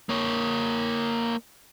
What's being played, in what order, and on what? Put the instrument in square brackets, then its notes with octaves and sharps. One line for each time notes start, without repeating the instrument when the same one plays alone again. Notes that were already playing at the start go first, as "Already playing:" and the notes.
[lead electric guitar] A#3 C#5